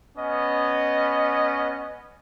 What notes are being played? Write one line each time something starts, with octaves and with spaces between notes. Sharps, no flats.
B3 C#4 D#5